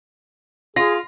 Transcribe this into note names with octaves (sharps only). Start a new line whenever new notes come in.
F4 G#4 A#6